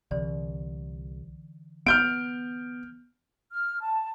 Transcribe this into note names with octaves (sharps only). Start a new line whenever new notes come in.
C2 D3 E3 D5
B3 F6 G6 D7
F6
A5